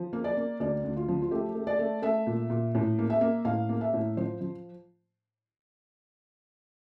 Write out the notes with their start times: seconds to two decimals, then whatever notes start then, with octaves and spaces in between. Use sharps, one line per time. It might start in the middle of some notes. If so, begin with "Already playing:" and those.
Already playing: F3
0.13 A#3
0.24 D5
0.37 A#3
0.60 D2 D5
0.84 D2
0.97 F4
1.08 F3
1.22 F4
1.31 A3 G4
1.55 A3
1.67 D5
1.79 A3
2.02 A3 E5
2.27 A#2
2.50 A#2
2.75 A2
2.99 A#3
3.10 E5
3.21 A#3
3.45 A2 F5
3.69 A#3
3.81 E5
3.94 A2
4.17 F3 C5
4.41 F3